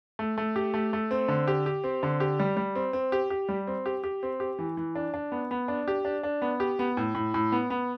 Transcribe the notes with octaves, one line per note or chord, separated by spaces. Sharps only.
A3
A3
G4
A3
A3
C4
D3
G4
G4
C4
D3
G4
G3
G3
C4
C4
G4
G4
G3
C4
G4
G4
C4
G4
E3
E3
D4
D4
B3
B3
D4
G4
D4
D4
B3
G4
B3
A2
A2
A2
B3
B3